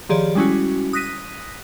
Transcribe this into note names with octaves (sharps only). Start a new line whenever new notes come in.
D#3 F3 G4 G#4 C#5 D5
G3 G#3 C#4 E4 F#4
D#6 F#6 A#6 B6 D#7